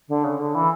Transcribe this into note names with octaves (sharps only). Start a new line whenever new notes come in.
D3
C#3
D3
E3